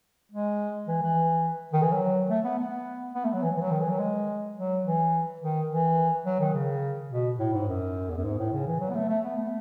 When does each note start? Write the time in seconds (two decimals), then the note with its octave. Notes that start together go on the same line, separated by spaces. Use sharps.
0.32 G#3
0.88 E3
1.02 E3
1.73 D#3
1.82 E3
1.92 F#3
2.30 A3
2.45 B3
2.58 B3
3.15 B3
3.25 A3
3.34 F#3
3.43 E3
3.57 E3
3.62 F#3
3.71 D#3
3.81 E3
3.90 F#3
3.99 G#3
4.57 F#3
4.85 E3
5.41 D#3
5.70 E3
6.26 F#3
6.40 D#3
6.54 C#3
7.11 B2
7.39 A2
7.53 G#2
7.68 F#2
8.10 E2
8.17 F#2
8.24 G#2
8.38 A2
8.53 C#3
8.67 E3
8.80 F#3
8.90 B3
8.95 A3
9.09 A3
9.24 B3
9.37 A3